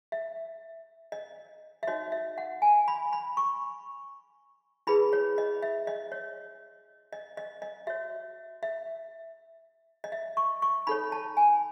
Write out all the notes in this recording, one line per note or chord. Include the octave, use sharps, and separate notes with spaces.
E5
D#5
E5
D#4 F#4 C#5 D#5
E5
F#5
G#5
B5
B5
C#6
E4 G#4 B4 B5
C#5
D#5
E5
D#5
C#5
D#5
D#5
D#5
F#4 C#5 E5
E5
D#5
E5
C#6
C#6
D#4 A4 C#5 B5
A5
G#5